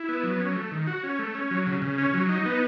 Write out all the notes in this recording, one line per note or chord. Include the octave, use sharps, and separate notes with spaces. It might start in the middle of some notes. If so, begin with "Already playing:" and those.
Already playing: E4
B3
F#3
C#4
A3
D#3
F#4
C#4
A3
C#4
F#3
C#3
C#3
C#4
F#3
D#4
B3